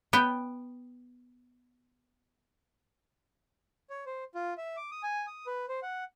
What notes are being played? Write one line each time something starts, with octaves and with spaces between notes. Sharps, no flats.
B3 G5
C#5
C5
F4
E5
D6
D#6
G#5
D#6
B4
C5
F#5